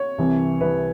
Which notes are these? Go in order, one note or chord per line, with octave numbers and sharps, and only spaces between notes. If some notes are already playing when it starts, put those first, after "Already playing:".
Already playing: C#5
C2 C3 E3
C2 C3 E3 B4